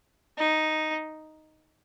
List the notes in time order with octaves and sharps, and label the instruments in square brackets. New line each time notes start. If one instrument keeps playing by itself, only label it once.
[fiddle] D#4